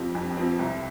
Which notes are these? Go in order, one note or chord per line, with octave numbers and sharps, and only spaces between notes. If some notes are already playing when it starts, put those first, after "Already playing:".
Already playing: F2 F3 C4 G4
F2
F3 C4
C2